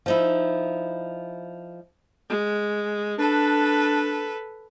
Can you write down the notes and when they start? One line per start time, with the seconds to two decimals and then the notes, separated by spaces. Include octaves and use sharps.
0.06 F3 D#4 E4
2.29 G#3
3.19 D4 A4 B4